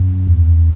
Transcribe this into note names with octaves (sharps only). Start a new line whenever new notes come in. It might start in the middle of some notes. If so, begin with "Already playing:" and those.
Already playing: F#2
E2